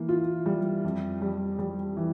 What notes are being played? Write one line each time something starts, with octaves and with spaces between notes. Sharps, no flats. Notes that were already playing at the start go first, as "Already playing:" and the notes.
Already playing: E3 A#3
F4
G3
F2
G3
G3
E3